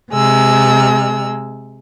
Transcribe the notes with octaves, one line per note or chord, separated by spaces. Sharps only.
C3 G#3 E6